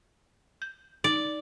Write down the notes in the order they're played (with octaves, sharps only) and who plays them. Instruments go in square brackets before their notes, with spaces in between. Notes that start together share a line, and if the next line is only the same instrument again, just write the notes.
[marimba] G6
[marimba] D#4 [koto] D5